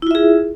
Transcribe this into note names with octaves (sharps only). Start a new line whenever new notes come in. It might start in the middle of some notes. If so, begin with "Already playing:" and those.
E4 F4 G#4 E5